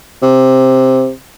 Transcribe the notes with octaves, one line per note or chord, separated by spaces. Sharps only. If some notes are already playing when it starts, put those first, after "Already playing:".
C3